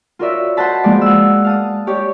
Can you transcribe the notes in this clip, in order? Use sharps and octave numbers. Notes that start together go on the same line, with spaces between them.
F4 F#4 A#4 C#5 D5 E5
C5 D#5 F#5 A5 B5
F3 G#3 A#3 B3 D5
F#5 E6
F5 A5 D#6
G4 C#5 D5